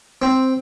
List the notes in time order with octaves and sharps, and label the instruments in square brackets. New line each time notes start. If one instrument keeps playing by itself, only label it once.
[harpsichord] C4